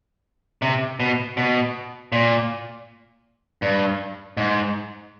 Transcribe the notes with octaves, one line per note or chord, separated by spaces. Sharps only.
C3
B2
B2
A#2
G2
G#2